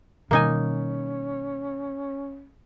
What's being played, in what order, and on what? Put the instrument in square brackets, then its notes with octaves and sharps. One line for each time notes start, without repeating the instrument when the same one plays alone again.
[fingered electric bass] B2 D#3 G3 [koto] A#3 D#4 G#5 [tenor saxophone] C#4